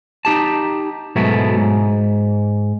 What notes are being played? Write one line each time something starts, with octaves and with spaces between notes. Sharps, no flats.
D#4 G4 A5
G#2 B2 F#3 A3 B3 E4
G#2